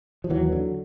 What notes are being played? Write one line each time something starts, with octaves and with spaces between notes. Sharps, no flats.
F3
D#2 E3 F#3
D3